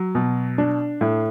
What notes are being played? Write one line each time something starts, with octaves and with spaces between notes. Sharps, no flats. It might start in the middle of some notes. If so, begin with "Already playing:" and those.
Already playing: F#3
B2
D4
A2